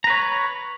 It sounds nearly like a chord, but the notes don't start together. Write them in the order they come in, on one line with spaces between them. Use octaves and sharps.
A#5 B4 C#5